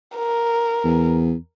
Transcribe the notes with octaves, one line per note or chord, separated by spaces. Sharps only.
A#4
E2